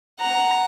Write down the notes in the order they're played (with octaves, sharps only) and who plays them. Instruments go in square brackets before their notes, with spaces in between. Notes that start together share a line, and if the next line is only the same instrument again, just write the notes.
[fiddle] F#5 [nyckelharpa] A#5